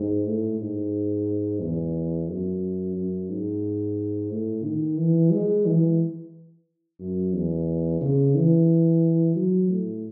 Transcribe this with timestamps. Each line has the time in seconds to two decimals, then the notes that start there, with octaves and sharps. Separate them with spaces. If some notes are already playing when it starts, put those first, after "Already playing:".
Already playing: G#2
0.26 A2
0.60 G#2
1.61 E2
2.29 F#2
2.96 F#2
3.30 G#2
4.31 A2
4.65 D#3
4.98 E3
5.32 G#3
5.66 E3
6.99 F#2
7.34 E2
8.01 C#3
8.35 E3
9.36 F#3
9.69 A2